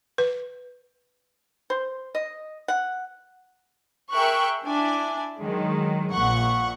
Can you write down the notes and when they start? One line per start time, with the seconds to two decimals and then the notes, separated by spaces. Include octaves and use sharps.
0.18 B4
1.70 C5
2.15 D#5
2.68 F#5
4.13 G#4 A#4 E5 G5 C#6 F#6
4.65 D4 E4 G#5
5.40 D#3 F#3 G#3
6.11 A#1 A#2 F#5 C#6